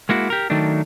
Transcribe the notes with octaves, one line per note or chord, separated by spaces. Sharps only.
G#3 A#3 E4 F#4
G4 A#4
D#3 F#3 A3 D4